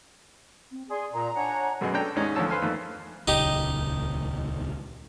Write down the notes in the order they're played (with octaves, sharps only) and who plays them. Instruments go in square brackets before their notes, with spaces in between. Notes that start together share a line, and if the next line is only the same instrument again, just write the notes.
[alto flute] C4
[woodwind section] G#4 [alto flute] D5 [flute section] C6
[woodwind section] A#2 [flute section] A#5
[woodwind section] D4 C#5 F#5 [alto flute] G#5
[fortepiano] F#2 B2 F#4 G#4 D#5
C#4 D4 A4 G5 A#5
D#2 G#2 G#3 C#4 D#5 A#5
D2 D3 F3 C#5 A5 E6
B4 C5 F5 G#5
F2 D#3 A3 A#3
[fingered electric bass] D#1 G#1 C#2 [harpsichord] D#4 G4